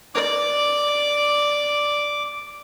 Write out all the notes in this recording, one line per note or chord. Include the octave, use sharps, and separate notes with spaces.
D5 D6